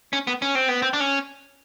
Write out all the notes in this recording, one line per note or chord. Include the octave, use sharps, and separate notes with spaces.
C#4
B3
C#4
C4
B3
C4
D4
C#4